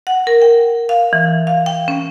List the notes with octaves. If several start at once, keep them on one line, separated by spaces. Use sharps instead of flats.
F#5
A#4
G5
F5
E3
F5
G5
C#4